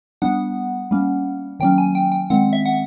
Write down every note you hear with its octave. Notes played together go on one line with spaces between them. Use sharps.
G3 B3 D4 F#5
G3 A#3 C#4
D#3 F#3 A#3 C#4 G5
G#5
G5
G5
D#3 G#3 C4 F#5
E5
F#5